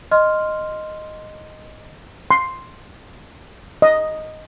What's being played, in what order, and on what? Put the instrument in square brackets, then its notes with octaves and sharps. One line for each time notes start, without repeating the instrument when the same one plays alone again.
[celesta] D#5 C6 F6
[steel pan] C6
D#5